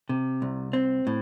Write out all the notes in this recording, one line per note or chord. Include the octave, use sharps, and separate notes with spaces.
C3
C2
C4
A2